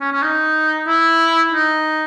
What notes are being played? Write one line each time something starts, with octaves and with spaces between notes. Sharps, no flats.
C#4
C#4
D#4
E4
D#4